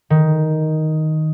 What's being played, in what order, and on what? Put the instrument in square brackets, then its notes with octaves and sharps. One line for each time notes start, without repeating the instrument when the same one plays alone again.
[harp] D#3